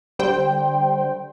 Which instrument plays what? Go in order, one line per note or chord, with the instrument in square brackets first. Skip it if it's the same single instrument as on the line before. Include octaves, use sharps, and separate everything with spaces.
[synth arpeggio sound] D3 G3 C5 G5